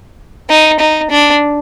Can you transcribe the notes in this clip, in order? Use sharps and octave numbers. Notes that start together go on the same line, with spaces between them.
D#4
D#4
D4